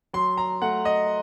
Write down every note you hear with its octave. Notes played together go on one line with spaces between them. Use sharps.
F#3 C6
A#5
A3 F#5
D#5